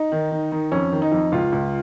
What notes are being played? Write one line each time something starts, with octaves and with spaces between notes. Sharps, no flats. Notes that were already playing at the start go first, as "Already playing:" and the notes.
Already playing: D#4
D#3
D#3
D#3
F2 C#4
D#3
D#4
F2
C#2 F4
C#2